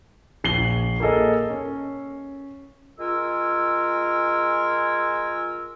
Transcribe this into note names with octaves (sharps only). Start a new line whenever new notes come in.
A#1 C7 F#7 G7
A#3 G#4 A4 D#5
C#4
G#3 F4 A#4 G#5 E6